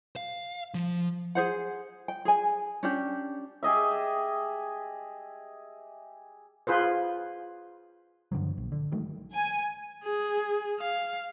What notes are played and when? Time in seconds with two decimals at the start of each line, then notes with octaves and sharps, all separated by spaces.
0.16 F5
0.74 F3
1.35 G#4 C5 F#5
2.08 G5
2.25 G#4 G#5
2.83 C#4 D4 G4
3.63 G4 G#4 D#5 E5
6.67 F4 G#4 B4 C5
8.32 G2 D3 F3 F#3
8.58 A#1
8.72 D3
8.92 D#3 F#3 G#3 A3
9.33 G#5
10.04 G#4
10.80 F5